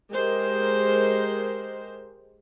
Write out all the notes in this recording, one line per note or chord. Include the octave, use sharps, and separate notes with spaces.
G#3 G4 A#4 C5